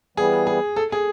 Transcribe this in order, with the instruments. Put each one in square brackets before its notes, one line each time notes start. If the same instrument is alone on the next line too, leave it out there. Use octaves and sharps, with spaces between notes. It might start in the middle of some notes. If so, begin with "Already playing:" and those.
[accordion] E3 G3 B3 [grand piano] G#4
[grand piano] G#4
A4
G#4